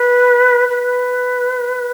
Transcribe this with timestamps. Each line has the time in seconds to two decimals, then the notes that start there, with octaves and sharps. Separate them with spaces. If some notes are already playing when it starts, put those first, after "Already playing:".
Already playing: B4
0.69 B4